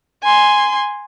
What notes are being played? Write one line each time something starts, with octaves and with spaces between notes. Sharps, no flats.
G#5 C6